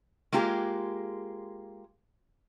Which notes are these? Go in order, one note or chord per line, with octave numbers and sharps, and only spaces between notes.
G#3 A#3 F4 G4 G#4